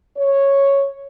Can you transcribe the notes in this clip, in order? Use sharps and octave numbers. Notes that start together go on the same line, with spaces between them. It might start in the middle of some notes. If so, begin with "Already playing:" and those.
C#5